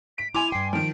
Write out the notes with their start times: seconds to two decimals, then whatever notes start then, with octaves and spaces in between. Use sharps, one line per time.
0.18 B6 D7
0.34 E4 G#5 C6 D6 F7
0.52 G2 G5 C7
0.73 D#3 F3 D7